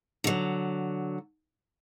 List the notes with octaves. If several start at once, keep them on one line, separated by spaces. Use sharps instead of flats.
D3 F#3